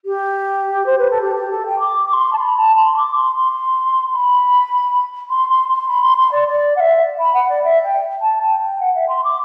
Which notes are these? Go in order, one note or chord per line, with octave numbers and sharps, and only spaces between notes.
G4
C5
B4
A4
G4
G4
A4
G5
D6
D6
C6
A5
B5
A5
C6
D6
C6
C6
B5
C6
C6
C6
B5
C6
C6
D5
D5
F#5
E5
B5
F#5
D5
E5
G5
A5
G5
G5
F#5
E5
C6
D6